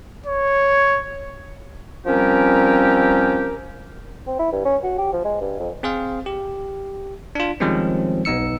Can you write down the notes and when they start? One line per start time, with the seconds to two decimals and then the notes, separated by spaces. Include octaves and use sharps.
0.26 C#5
2.05 F3 G3 C4 C#4 G4 A#4
4.27 C4
4.39 E4
4.53 G2
4.65 C#4
4.84 F#4
4.98 G4
5.13 F3
5.25 G#3
5.41 G2
5.59 F2
5.83 C4 G#4 C5 F5
6.26 G4
7.35 D4 F4
7.60 D#3 F3 G3 G#3 C4 C#4
8.25 B1 B3 D#4 E6 C#7